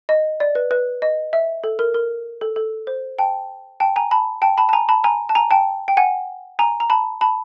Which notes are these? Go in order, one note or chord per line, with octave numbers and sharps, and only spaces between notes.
D#5
D5
B4
B4
D#5
E5
A4
A#4
A#4
A4
A4
C5
G5 A5
G5 A5
G#5 A#5
A5 B5
G5 A5
A5 B5
A5
G#5 A#5
A5 B5
G#5 A#5
A5
G#5 A#5
G5 A5
G5
F#5 G#5
G#5 A#5
A#5
A5 B5
A5 B5